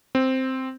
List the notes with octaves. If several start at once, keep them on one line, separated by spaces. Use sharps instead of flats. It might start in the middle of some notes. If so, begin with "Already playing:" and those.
C4